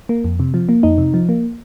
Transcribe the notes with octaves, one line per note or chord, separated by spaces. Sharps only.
A#3
F2
C3
F3
A#3
F2 D#4
C3
F3
A#3